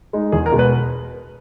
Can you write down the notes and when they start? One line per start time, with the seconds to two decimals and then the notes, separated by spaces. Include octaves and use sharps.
0.13 G#3 D#4
0.32 E2 G#4
0.46 A#4
0.52 B2 G#3
0.59 B4